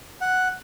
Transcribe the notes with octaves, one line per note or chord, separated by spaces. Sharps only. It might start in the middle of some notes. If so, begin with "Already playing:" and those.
F#5